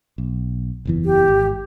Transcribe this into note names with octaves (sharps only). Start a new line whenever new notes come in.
B1
F#1 E2 E3
G4
G#1